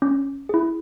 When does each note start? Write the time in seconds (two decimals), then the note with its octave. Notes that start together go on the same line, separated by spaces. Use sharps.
0.02 C#4
0.49 E4 G#4